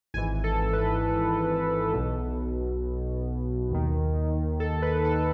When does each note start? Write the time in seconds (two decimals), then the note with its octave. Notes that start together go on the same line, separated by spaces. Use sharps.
0.14 G#1 G#2 E3 G#5
0.44 A4
0.73 B4
1.93 B1 B2
3.71 D#2 D#3
4.60 A4
4.82 B4
5.05 A4